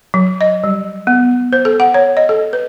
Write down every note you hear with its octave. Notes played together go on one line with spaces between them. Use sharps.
F#3
D#5
G3
B3
C5
A4
F#5
C#5
D#5
A4
B4